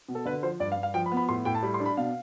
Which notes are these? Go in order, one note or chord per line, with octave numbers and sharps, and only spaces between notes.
B2
A4
D3 B4
F3 C5
G2 D5
F5
G2
F5
F3 G5
B5
B3
B5
A2 C6
A2 G5
A5
G3 B5
C6
D4
B5
B2 F5